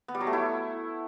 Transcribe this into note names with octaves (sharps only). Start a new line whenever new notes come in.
B3
G3
F#3
A3
E4